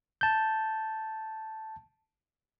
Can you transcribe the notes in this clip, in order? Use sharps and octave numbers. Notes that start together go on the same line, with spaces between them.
A5 G6